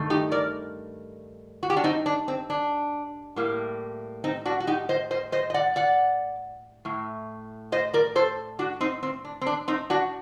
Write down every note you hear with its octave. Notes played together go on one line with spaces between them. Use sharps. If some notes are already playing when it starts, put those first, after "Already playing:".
Already playing: G2 D#3 A3
D#4 G4
A#4 D5
F#4
G4
D4 F#4
C4 D#4
D4
C4
D4
A2 G3 A#3
C4 D#4
D4 F#4
F#4
D#4 G4
C5 D#5
C5 D#5
C5 D#5
D#5
D5 F#5
D5 F#5
A2 A3
C5 D#5
A#4 D5
A4 C5
D4 F#4
C4 D#4
C4
D4
C4
D4
C4 D#4
D4 F#4